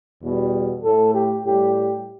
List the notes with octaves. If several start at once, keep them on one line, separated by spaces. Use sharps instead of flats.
E2 B2 G3
A2 A3 A4
G4
A2 G3 G4